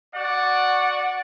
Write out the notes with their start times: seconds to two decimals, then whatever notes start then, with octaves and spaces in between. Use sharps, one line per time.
0.15 F#4 D5 F#5